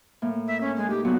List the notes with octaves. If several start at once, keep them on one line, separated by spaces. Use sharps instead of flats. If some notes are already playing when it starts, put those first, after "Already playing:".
A2 A#3
E5
C#4
G#3
D#4 G4
A#2 F#3 B3 F#4